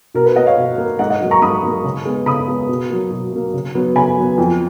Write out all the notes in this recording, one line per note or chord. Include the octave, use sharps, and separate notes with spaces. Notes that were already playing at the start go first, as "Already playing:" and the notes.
B2 A#4
B4
A#3 D#5 F#5
C#5 F5
B2
A#3
G#2 D#5 F#5
D#5 F#5
F#3 A#3
A#5 C#6
G#2 B5 D#6
F#3 A#3
C#3
G#3 B3
C#3 B5 D#6
G#3 B3
B2
F#3 A#3
B2
F#3 A#3
C#3
F#3 B3
C#3 G#5 B5
F#3 B3
F2